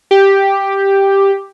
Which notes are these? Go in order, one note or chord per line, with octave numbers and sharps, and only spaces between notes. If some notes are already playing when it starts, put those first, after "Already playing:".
G4